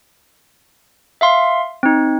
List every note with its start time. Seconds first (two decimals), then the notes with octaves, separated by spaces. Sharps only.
1.21 E5 F5 C6
1.83 C4 D#4